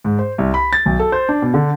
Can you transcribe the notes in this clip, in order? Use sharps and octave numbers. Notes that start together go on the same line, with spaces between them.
G#2
C5
C2
B5
A6
B1
A4
C5
D4
B2
D3